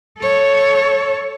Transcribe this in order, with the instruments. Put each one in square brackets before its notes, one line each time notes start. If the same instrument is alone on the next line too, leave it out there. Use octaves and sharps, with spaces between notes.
[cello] A4 C#5